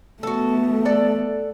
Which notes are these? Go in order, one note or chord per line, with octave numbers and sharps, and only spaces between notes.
A3 B3 F#4 A4
A4 D5 F#5